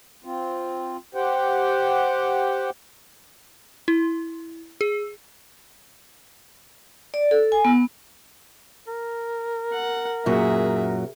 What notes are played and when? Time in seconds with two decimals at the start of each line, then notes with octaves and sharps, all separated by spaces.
0.24 C4 F4
1.15 G4 C5 F#5 G5
3.88 E4
4.81 G#4
7.14 D5
7.31 A4
7.52 G#5
7.65 B3
8.88 A#4
9.73 F#5
10.26 F#2 A#2 F#3 G#4 E5